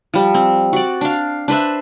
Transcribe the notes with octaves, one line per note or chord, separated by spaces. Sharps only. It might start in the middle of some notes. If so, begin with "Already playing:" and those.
F3 G3
C4
F#4 D5
D4 F5
D4 B4 C5 E5